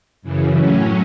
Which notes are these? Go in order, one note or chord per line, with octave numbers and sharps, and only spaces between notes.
F#2 C#3 E3
A2 F#3 C#4